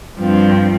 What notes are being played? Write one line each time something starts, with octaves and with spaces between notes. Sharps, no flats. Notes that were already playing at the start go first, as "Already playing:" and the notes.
G2 F3 C4